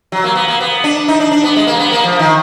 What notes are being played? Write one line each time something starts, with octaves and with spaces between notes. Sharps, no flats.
F#3
A#3
B3
A#3
B3
D4
D#4
D4
D4
B3
G#3
A#3
B3
A#3
F3
D#3